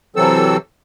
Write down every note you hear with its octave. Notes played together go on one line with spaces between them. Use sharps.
C3 E3 F#3 C4 A4 E6